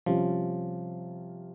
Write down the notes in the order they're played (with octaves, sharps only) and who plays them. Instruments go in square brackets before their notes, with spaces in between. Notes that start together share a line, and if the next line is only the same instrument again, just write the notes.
[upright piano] C3 G3 C#4 F4 [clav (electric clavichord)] F3